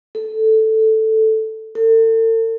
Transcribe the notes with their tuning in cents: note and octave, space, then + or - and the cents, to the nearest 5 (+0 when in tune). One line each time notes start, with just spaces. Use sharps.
A4 +0
A4 +40